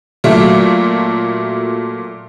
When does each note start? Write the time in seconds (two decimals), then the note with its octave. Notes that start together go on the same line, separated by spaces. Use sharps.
0.24 A#2 F#3 A3